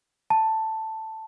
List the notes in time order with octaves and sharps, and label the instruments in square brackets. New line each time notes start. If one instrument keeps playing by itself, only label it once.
[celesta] A5